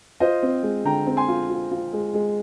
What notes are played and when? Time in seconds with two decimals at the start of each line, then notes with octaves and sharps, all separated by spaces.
0.20 F4 C5 D#5
0.42 C4
0.63 G#3
0.85 D3 G5 A#5
1.07 C4
1.17 G#5 C6
1.28 F4
1.49 F4
1.71 F4
1.93 G#3
2.14 G#3